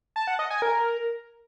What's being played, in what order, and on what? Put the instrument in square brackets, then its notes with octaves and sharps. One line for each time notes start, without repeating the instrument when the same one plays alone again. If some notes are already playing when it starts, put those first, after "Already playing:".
[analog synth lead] A5
F#5
D#5
G#5
A#4